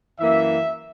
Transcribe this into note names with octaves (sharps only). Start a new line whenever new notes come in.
F#2 E3 A#3 E5